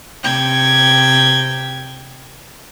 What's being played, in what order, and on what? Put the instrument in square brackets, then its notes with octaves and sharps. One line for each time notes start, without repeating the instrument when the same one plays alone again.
[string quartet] C3 G5 G#6